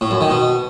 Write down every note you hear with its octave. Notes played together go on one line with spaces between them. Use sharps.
A2
F#2
D#3
B2